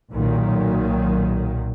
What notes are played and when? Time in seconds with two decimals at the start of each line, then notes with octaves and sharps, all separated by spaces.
0.12 B1 A#2 D#3 F#3